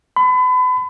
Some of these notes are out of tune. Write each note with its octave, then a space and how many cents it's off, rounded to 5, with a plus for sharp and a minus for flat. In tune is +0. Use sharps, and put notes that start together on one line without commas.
B5 +35